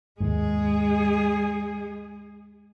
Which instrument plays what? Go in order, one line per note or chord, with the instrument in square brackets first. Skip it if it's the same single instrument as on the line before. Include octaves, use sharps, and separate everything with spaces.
[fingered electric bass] D#2 G#2 [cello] G#3 G#4